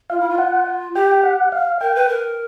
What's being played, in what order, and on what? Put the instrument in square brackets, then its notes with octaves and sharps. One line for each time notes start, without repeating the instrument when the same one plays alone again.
[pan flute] F4 [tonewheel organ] F5
[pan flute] E4
F4
[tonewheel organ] F#5
[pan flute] G4 [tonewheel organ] G5
[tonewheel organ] F#5
F5
[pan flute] A#4 [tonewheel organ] G5
[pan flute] B4
A#4